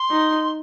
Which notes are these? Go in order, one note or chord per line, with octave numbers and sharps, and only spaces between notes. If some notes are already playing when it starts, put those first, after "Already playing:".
Already playing: C6
D#4